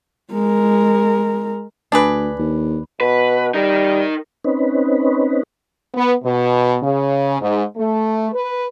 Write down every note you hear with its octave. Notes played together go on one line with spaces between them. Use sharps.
G#3 A#4
D2 D4 G#4 B4
D#2
B2 B4
G3 D#4 A#4
C4 C#4 D#4 B4
B3
B2
C#3
G#2
A3
B4